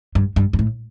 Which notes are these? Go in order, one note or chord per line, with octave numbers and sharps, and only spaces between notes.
G2
G2
G2
A2